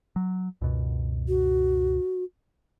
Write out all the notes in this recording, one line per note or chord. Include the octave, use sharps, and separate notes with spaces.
F#3
C#2 F#2 B2
F#4